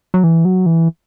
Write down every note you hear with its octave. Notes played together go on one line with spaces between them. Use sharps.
F#3
E3
F#3
E3